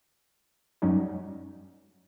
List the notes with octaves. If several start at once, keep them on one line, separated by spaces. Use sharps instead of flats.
F#2 F#3 G3 C#4 D#4